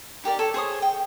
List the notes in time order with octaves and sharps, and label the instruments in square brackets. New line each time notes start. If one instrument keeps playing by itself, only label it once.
[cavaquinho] D#4 G4 A#4 D5
A4 C#5
G#4 C5 C#5 D#6
G5